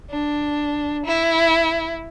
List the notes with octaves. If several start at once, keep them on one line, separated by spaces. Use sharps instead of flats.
D4
E4